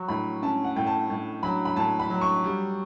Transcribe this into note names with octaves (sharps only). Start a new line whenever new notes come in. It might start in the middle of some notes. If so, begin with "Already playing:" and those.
Already playing: F#3 C#6
A2 B5
C#4 A5
F#5
A2 G5
A5
A2
F#3 B5
B5
A2 A5
B5
F#3
C#6
G3